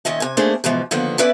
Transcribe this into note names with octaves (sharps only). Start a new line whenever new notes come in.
A#2 D#3 C#4 D#5 E5
C3 G#5
A3 A#3 C#4 D4 G#4 C5
G#2 B2 E3 F3
D3 D#3 F3 A#3 B3
C#4 E4 B4 D5 E5